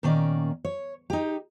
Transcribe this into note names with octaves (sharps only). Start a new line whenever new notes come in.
A#2 D#3 A#3 C#4 D5
C#5
D#4 G4